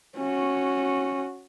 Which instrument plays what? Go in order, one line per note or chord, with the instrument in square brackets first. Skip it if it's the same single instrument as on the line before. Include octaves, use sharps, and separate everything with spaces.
[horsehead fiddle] C#4 F#4